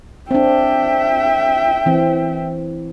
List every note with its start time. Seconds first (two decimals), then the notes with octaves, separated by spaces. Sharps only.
0.31 C4 D4 E5 G5
1.86 E3 C4